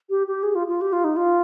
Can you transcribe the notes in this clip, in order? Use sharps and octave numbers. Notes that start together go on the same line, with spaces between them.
G4
G4
G#4
F4
F4
G4
F4
D#4
F4